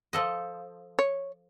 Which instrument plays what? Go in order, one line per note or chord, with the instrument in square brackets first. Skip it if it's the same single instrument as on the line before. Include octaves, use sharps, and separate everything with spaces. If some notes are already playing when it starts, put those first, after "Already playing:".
[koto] F3 A4 D#5
[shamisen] C#5